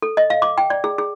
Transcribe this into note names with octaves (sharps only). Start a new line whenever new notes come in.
A4
D#5
F5
D6
G5
D5
G#4
G#4